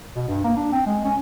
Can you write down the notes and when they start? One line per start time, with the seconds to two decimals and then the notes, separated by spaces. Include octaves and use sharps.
0.16 B2
0.28 G2
0.44 A#3
0.57 D4
0.72 C4
0.86 G#3
1.05 C#4